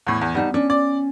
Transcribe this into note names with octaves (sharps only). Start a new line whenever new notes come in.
E2 A2
E2
G3 B3 D#4 A5
C#4 D4
D5